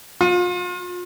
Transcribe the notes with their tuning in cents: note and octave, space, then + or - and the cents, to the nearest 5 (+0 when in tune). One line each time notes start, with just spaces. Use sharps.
F4 +35